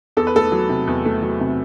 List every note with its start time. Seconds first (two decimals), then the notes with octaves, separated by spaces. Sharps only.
0.17 E2 A4
0.27 B4
0.35 A3 A4
0.52 F#3
0.69 C3
0.87 E2
1.05 A3
1.22 F#3
1.40 C3